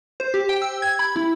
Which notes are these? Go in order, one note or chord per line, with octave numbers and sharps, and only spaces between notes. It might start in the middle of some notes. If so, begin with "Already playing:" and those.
C5
G4
G5
E6
G#6
B5
E4